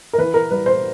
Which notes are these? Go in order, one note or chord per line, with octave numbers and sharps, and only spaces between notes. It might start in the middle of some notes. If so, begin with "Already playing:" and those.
A#4
E3 B4
A#4
G3 B4
C5